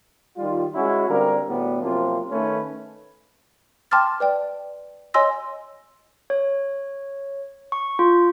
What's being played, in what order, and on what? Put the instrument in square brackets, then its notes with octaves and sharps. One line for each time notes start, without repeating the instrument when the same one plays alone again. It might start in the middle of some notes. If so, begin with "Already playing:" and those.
[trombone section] D#3 G3 F4
G#3 C#4 E4 F#4
D3 G3 A#3 C4 A#4
D2 A2 G3 B3
F#2 C3 F3 A#3 F4
D#3 A3 C#4 B4
[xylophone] G5 A5 C6 D6 F6 A6
B4 D5 G5
C#5 D#5 G#5 C6 E6 A#6
[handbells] C#5
C#6
F4